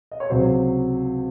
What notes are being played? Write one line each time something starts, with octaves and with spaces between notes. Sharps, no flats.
D#5
C#5
C#2 C3 F#3 C5